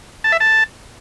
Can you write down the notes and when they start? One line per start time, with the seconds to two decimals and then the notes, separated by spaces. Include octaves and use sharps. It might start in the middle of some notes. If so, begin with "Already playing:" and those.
0.24 A5
0.32 E5
0.40 A5